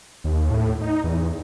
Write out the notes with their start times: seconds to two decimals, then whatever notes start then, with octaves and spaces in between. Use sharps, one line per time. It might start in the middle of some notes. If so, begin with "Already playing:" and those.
0.24 D#2
0.50 A2
0.81 D#4
1.04 E2